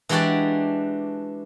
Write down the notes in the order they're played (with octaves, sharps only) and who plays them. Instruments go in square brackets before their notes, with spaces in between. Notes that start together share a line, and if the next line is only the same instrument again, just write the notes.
[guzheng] E3 G#3 D4 F#4 G4 D5